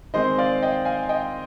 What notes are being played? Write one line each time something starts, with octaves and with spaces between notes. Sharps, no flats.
D#3 G#3 C4 C5 D#5
D5 F5
D#5 G5
F5 G#5
D#5 G5